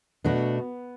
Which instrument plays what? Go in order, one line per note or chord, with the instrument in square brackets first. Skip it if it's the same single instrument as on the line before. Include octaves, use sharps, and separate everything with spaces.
[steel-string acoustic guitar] B2 A3 D4 F#4 [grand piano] B3